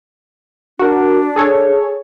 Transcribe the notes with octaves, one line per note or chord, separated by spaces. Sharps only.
D4 F#4 A#4
G#4 A4 C#5